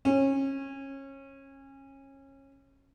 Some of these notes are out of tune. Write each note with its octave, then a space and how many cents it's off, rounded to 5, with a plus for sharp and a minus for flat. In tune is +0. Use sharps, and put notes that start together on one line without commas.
C#4 -25